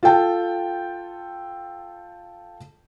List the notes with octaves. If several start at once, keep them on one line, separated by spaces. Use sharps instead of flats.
F4 A4 G5 A5